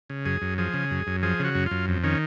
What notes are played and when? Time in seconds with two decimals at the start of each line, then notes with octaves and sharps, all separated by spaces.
0.10 C#3
0.25 F#2 G#4
0.42 F#2
0.58 F3 G#4
0.74 C#3
0.91 F#2
1.07 F#2
1.23 F3 G#4
1.40 C#3
1.45 F#4
1.55 F#2
1.66 F#2 F4
1.88 F2
2.04 D#3 C#4